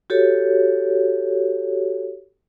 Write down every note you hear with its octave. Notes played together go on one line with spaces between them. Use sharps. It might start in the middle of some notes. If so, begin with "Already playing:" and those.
F#4 G4 A4 C#5